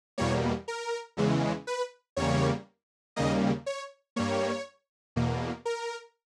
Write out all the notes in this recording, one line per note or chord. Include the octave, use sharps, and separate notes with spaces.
E2 B2 G3 A#3 C#5
A#4
E2 C#3 E3 G#3
B4
E2 C#3 G3 A#3 C#5
D#2 C#3 G3 A#3 D#5
C#5
G2 G3 A#3 C#5
E2 B2 A#3
A#4